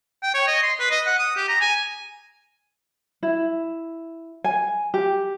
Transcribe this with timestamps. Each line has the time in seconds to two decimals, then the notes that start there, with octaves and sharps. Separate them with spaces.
0.23 G5
0.34 C#5
0.47 D#5
0.63 C6
0.79 B4
0.90 D#5
1.06 F#5
1.19 D#6
1.36 G4
1.48 A#5
1.61 G#5
3.23 E4
4.44 G#5
4.94 G4